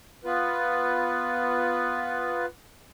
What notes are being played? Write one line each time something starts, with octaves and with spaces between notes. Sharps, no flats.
B3 F4 B4